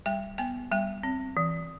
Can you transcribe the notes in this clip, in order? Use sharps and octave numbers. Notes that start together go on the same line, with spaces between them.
G3 G5
B3 G5
G3 G5
C4
E3